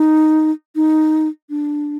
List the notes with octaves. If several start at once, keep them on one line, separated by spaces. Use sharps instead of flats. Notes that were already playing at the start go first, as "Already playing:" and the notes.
Already playing: D#4
D#4
D4